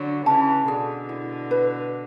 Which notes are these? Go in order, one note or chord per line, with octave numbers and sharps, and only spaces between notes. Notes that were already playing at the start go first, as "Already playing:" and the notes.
Already playing: D3 F#3
C#3 E3 A5
B2 D3 G#4
E4
B4